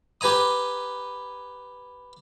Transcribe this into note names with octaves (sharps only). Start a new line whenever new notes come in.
G4 B4 G#5 A#5 D#6